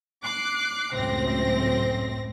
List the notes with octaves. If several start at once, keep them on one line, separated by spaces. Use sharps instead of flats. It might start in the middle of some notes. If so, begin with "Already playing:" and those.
D6 F#6 C7
C#2 F#2 A2 C4 A#6